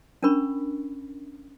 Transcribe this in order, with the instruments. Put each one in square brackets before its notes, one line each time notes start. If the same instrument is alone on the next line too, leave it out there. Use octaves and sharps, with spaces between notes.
[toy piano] C#4 D4 A#4 B5 C#6